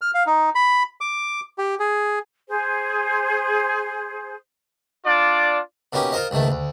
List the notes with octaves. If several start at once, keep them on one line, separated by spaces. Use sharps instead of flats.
F6
F5
D#4
B5
D6
G4
G#4
G#4 C5
D4 F4 D5
B2 A#3 C#4 D#4 G4
F4 A#4 C5 D#5
C#2 G#2 D#3 A3
D2